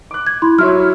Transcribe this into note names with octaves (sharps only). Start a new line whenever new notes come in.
D6 F#6
G#6
E4 B5 C6
F#3 E4 C#5 F6